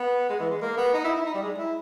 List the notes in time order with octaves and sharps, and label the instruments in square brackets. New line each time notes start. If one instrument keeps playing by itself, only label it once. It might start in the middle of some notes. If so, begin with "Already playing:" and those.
Already playing: [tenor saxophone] B3
G#3
E3
G#3
A#3
B3
D#4
E4
E4
D#4
G3
G#3
E4